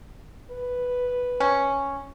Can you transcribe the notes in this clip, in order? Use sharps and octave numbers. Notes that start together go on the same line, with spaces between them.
B4
C#4